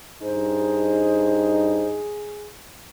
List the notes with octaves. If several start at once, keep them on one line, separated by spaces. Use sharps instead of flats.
G2 D#4 G#4 C5